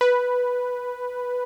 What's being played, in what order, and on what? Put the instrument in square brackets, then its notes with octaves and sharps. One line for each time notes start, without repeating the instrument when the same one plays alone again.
[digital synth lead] B4